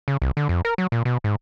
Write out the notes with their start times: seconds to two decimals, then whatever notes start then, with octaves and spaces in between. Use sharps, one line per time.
0.08 C#3
0.22 C2
0.37 D3
0.49 F2
0.65 A#4
0.78 F#3
0.92 A#2
1.05 B2
1.24 G#2